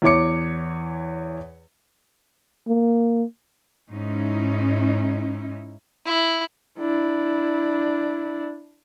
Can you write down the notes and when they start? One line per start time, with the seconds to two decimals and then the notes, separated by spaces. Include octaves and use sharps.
0.02 E2 E3 C#5 D6 C#7
2.68 A#3
3.91 G#2 C#4 D#4 E4
6.06 E4
6.79 D4 E4